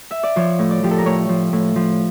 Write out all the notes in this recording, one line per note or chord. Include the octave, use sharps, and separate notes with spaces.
E5
D5
F3 C#5
A2
D5
F3 G4
A4
A#4
A2 C#5
F3
A2
F3